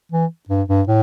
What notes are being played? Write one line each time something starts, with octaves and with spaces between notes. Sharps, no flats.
E3
G2
G2
A2